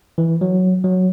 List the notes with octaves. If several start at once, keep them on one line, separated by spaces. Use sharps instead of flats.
E3
F#3
F#3